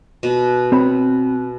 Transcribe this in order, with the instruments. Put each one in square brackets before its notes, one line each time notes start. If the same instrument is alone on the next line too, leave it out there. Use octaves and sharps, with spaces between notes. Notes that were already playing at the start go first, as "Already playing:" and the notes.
[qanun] B2
[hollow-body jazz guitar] C4 C#5 B5